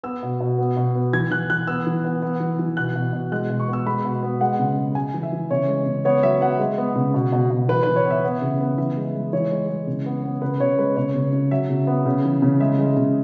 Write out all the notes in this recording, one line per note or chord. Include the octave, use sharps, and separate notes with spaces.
B3 E6
B2
B2
B3
B2
B3
E3 G#6
E3 F#6
E3 F#6
B3 E6
E3
B3
B3
E3
E3
B2 F#6
B2
B2
G#3 F#6
B2
C#6
B3
E6
G#3 B5
B2
B3
G#3 F#5
C#3
G#3
G#3 G#5
E3
E5
E3
C#3 C#5
G#3
C#3
B3 C#5
F#3 E5
B3 F#5
G#3
B3
C#3
B2
B2
B2
E3 B4
E3 B4
C#5
B3
E5
B3
C#3
B3
E3 E5
G#3
G#3
E3 C#5
G#3
G#3
C#3
B3
B3
C#3 B4
C#3 C#5
G#3 B4
C#3 C#5
C#3
C#3
F#3 E5
C#3
B3
C#3
E3
C#3
G#3 E5
G#3
C#3